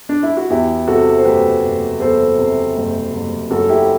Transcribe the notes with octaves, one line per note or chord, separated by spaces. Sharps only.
D4
E4
F#4
E2 E4 G4
C3 F#4 A4
C5
F#1 G4 B4
F#1
E2 A4 C5
C3
F#1
F#1
F#2 F#4 A4
E4 G4